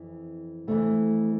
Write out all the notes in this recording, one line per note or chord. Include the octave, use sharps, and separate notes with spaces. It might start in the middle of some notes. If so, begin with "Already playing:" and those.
Already playing: F2 E3
F2 E3 A3